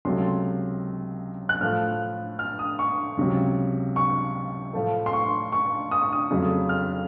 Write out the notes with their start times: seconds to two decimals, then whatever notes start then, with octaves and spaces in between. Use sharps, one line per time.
0.05 C#2 C3 F#3 A3 C6
1.49 F#6
1.61 A2 F3 A3 F6
2.39 F6
2.59 D#6
2.79 C#6
3.17 C#2 C3 F#3
3.96 C#6
4.73 A2 F3 A3
5.06 C6
5.13 C#6
5.52 C#6
5.91 D#6
6.02 C#6
6.13 D#6
6.31 F2 C#3 F#3 A3
6.69 F6